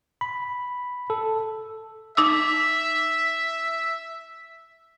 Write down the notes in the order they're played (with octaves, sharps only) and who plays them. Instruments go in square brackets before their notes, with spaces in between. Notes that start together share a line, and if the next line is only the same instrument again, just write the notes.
[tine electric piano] B5
A4
[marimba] D#4 D6 E6 [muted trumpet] E5